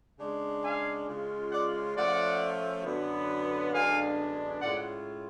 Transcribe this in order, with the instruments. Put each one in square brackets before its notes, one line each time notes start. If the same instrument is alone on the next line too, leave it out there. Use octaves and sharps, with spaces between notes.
[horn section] C#3 G#3 D4
F5 G#5
C#3 G#3 C#4 F4
D5 F#5
F3 A3 C#4 F4 D5 F#5
F#2 D3 F#3 B3
F#2 D3 G#3 B3 D4 F5 G#5
A2 G#3 C#4 F4 D5 F#5